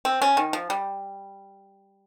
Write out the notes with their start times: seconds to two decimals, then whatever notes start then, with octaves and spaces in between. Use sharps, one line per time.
0.05 C4
0.22 C#4
0.37 D#3
0.53 F3
0.70 G3